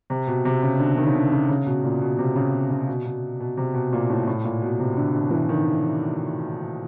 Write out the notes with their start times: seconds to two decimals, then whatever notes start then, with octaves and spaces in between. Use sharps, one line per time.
0.10 C3
0.27 B2
0.45 C3
0.63 C#3
0.79 D3
0.97 D#3
1.07 C#3
1.14 D3
1.32 C#3
1.49 C#3
1.66 B2
1.84 A#2
2.01 B2
2.19 C3
2.35 C#3
2.71 C#3
2.87 B2
3.05 B2
3.40 B2
3.57 C3
3.74 B2
3.92 A#2
4.10 A2
4.27 A2
4.44 A#2
4.62 B2
4.80 C3
4.97 D3
5.14 D3
5.31 E3
5.49 D#3